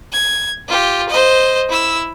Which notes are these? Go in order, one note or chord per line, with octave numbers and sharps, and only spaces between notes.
G#6
F4 G4
C5 D#5
E4 E6